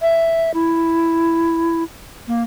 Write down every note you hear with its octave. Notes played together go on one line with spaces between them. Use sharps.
E5
E4
A#3